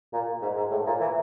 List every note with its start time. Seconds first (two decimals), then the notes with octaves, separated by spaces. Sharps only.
0.13 A#2
0.42 G#2
0.57 G#2
0.71 A2
0.86 A#2
1.01 E3